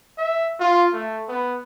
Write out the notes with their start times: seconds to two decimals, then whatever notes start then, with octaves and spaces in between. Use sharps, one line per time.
0.18 E5
0.60 F4
0.93 A3
1.28 B3